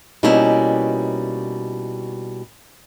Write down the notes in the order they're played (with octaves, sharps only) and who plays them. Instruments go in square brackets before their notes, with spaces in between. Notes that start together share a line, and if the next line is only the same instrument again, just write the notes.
[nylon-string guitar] B2 G3 A#3 C#4 D#4 E4